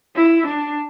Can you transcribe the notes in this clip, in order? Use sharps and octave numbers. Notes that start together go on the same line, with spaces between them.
E4
D4